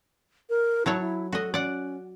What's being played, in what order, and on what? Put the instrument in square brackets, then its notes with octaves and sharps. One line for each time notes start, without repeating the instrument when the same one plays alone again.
[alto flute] A#4
[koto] F#3 A4 C#5 [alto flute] E4
[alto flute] E4
[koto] F#4 D#5 [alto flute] A4
[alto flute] C#4 [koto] D5 F#5